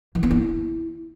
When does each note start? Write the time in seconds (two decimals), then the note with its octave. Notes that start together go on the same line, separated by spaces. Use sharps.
0.15 E3
0.23 B3
0.31 E4